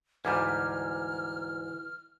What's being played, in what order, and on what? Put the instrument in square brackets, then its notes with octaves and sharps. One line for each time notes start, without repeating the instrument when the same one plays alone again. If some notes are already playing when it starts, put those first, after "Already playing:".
[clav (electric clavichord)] D2 G#2 G3 [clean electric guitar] E3 [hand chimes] A#5 D6 G#6 [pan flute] F6